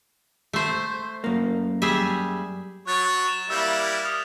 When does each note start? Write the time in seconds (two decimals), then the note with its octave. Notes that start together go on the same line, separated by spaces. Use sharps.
0.53 A3 C5
1.24 F#2 A#3
1.82 G3 G#4 E5
2.87 F#3 C#5 F#6 A6
3.28 E7
3.50 G3 A#3 E4 E6 G6 A6
4.05 D#6 F6